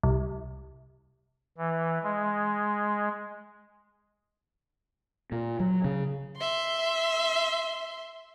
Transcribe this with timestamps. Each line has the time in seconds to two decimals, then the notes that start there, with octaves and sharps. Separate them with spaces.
0.03 C2
1.58 E3
2.03 G#3
5.32 A#2
5.60 F#3
5.84 C#3
6.38 E5 C6